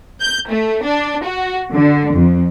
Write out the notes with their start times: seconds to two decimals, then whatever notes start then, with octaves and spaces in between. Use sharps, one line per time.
0.21 G6
0.50 A3
0.84 D4
1.23 F#4
1.73 D3
2.15 F2